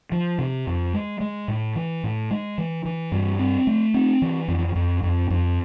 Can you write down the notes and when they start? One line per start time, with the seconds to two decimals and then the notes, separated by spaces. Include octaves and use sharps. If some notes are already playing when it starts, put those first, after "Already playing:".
0.12 F3
0.38 C3
0.67 F2
0.94 G#3
1.20 G#3
1.48 A2
1.75 E3
2.03 A2
2.31 G#3
2.58 E3
2.85 E3
3.12 G2
3.39 C4
3.67 A3
3.94 C4
4.22 E3
4.48 F2
4.75 F2
5.03 F2
5.30 F2